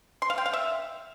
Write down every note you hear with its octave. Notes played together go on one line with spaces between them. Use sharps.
C6
F5
G5
F5
E5